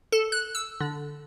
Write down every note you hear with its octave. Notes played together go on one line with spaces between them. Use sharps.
A4
F#6
E6
D3